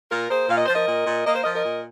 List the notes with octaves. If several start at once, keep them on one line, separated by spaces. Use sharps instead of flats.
A#2 F4 A#4
A#3 G#4 C5
A#2 F5
D#5
F3 C5
A#4 D#5
A#2
A#2
A#3 D#5
C5
F3 A#4 D#5
A#4 D#5
A#2